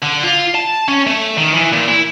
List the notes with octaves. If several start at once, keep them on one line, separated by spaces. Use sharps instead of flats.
D3
F4
A5
C#4
A3
D#3
E3
A#2
E4